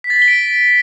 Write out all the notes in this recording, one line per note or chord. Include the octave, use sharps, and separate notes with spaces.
B6
A6
B6
G7
D7